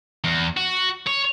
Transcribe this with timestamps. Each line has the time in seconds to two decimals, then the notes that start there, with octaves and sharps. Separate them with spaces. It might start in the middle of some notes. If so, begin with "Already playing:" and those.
0.24 E2
0.57 F#4
1.07 C#5